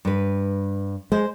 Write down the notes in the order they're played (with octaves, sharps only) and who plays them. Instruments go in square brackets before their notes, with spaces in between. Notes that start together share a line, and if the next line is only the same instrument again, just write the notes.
[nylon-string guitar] G2 B4
[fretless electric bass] G#3 [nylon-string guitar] C5